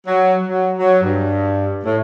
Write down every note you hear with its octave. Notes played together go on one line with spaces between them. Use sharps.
F#3
F#3
F#3
G2
A2